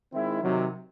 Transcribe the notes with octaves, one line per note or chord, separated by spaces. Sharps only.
D#3 G#3 C4 E4
C3 D#3 F#3